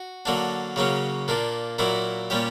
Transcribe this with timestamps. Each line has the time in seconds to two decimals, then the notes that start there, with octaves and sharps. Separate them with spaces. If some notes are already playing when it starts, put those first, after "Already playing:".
Already playing: F#4
0.25 D3 F#3 A#3 D4
0.76 C#3 F#3 A#3 C#4
1.28 A#2 A#3 D4
1.79 A#2 F#3 A#3 E4
2.30 A#2 G3 C#4 G4